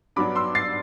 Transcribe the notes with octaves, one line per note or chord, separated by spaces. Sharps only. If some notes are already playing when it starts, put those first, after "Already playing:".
G2 F#3 B3 D4 B5 D6
C6 E6
A6 C7